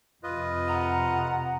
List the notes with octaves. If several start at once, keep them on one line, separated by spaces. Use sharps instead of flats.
F2 C3 F4 B4 D#5
F#5 A#5